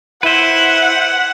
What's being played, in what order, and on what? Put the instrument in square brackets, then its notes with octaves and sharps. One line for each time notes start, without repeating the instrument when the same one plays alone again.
[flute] E4 [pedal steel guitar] B4 C5 [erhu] F#5